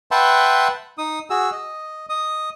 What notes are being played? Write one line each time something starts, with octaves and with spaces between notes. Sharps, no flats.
B4 E5 F#5 G5 A5 C6
D#4 D#6
F#4 G#4 E6
D#5
D#5 D#6